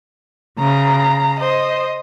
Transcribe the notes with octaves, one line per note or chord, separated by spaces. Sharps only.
C#3 A#5
C5 D#5